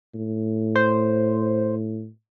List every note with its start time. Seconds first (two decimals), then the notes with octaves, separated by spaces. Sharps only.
0.15 A2
0.76 C5